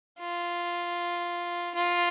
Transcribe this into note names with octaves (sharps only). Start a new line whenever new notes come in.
F4
F4